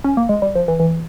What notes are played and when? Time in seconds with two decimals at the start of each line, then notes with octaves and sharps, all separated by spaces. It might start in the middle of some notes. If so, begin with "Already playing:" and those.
0.04 C#4
0.17 A#3
0.29 G#3
0.42 G3
0.55 F3
0.68 E3
0.80 E3